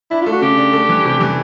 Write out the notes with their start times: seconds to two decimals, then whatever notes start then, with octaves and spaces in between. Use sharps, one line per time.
0.11 D4 E4
0.21 A3 F4
0.32 F#4
0.41 C#3 G4
0.58 D4
0.73 A3
0.89 E3
1.05 C3
1.21 E3